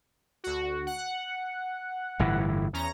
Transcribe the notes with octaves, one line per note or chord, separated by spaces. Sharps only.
D2 F#4
F#5
G1 A2 E3
E2 C#4 A#5